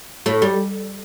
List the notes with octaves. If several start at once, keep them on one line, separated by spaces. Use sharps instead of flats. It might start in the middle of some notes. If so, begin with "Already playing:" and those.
A2 A3
G3